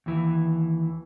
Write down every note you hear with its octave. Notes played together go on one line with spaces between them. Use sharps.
D#2 E3